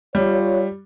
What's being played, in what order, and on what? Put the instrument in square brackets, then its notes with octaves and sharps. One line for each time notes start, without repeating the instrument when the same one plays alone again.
[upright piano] G3 [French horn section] F4 C#5